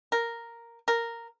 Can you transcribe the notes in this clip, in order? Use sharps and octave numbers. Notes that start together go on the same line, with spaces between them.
A#4
A#4